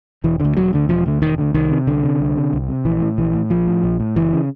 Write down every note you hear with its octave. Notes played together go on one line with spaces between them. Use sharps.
E1 E3
D2 D3
E1 F#3
D2 D3
E1 F3
D2 D3
E1 D#3
D2 D3
C2 D#3
C3
C2 D3
C3
C2
C3
C2
C3
A#1 E3
A2
A#1 E3
A2
A#1 F3
A2
A#1
A2
F#1 E3
C#3